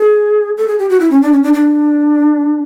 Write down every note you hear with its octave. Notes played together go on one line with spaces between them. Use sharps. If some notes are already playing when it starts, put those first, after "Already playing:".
Already playing: G#4
A4
G#4
G4
F#4
E4
C#4
D4
C#4
D4
D4